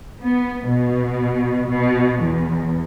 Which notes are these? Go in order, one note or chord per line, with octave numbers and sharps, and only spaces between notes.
B3
B2
B2
E2